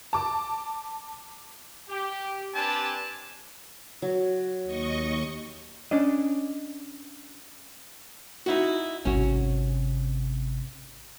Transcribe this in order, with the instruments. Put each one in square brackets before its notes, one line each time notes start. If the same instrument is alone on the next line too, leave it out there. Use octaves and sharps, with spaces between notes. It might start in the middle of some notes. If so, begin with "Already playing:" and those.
[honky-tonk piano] A5 D6
[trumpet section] G4
C4 D4 G4 B4 G#5 A5
[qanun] F#3
[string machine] D#2 D#5 C#6
[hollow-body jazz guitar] C#4 D4 D#5
D#4 E4 F#4
[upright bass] G#1 C3 [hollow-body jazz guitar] C#4 F#4